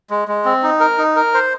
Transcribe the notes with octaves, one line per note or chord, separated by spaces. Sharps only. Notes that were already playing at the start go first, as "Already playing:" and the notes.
G#3
G#3
C4
D#4
A#4
D#4
A#4
C5